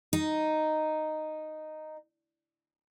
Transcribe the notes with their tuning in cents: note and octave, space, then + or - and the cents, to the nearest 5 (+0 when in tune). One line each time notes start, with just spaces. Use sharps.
D#4 -5